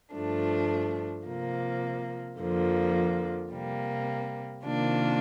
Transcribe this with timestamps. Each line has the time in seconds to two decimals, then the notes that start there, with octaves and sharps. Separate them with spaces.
0.13 G2 F3 A3 D4
1.27 C3 F3 A#3
2.39 F2 D3 F3 A#3
3.52 C3 G3 A#3
4.65 C3 D#3 A#3 D4 F4